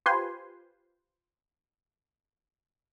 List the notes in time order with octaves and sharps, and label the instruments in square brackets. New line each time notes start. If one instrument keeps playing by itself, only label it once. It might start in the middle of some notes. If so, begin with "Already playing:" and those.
[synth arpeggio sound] F4 G4 B4 C5 G#5 C6